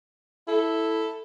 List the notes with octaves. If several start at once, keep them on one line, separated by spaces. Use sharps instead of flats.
E4 A4